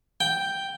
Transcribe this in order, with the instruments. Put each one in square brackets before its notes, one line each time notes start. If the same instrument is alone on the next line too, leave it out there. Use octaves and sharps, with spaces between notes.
[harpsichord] G5